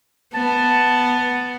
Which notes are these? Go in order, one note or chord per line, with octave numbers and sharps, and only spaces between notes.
B3 A5